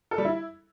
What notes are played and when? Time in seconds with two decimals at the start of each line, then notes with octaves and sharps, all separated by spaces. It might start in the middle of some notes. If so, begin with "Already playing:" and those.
0.11 A4
0.18 G3
0.25 E4